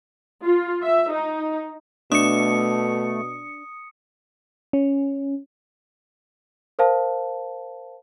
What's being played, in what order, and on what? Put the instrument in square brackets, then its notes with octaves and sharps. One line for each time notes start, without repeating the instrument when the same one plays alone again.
[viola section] F4
E5
D#4
[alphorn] B2 [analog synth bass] A3 [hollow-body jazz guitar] D4 [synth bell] D#6 C#7
[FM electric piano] C#4
[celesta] A#4 C5 F5 A5